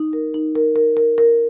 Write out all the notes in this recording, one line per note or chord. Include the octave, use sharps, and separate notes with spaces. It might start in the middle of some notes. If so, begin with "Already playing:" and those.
Already playing: D#4
A#4
D#4
A#4
A#4
A#4
A#4